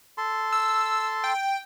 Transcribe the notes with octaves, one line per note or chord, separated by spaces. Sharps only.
A4 A5 C6
E6
G5